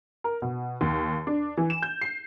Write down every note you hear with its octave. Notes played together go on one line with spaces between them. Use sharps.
A#4
B2
D#2
D4
E3
E7
G6
C7